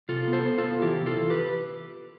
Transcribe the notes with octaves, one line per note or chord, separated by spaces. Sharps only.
C3 F4 A4
B3
A4 C5
B3
F4 A4
B3
E3 E4 G4
C3
F4 A4
E3
G4 B4